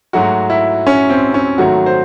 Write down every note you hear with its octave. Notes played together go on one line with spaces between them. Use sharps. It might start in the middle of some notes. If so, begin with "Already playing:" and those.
G#2 F#3 A3 F#4
E4
C#4
C4
C#4
G#2 D#3 F#3 A3 F#4
C5